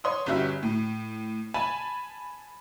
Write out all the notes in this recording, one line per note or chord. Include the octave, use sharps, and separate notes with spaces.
C#5 C6 D#6
G1 G3 C#4 F#4 E5
A2
G#5 A5 B5